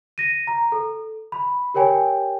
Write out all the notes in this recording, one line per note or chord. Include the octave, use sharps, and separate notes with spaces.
A#6 D#7
A#5
A4
B5
G4 A#4 C#5 G5 G#5